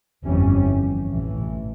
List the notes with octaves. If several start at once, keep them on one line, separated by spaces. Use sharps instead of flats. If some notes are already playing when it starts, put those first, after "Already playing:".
G1 F2 E3 G3 C#4
A1 A2 E3